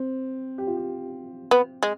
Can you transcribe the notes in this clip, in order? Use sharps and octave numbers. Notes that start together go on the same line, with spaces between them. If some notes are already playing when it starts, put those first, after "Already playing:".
Already playing: C4
G4
F4
G4
B3
G#3